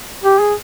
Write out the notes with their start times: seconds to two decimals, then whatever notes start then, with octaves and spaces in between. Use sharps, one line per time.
0.24 G4
0.40 G#4